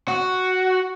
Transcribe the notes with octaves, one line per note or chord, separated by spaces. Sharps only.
F#4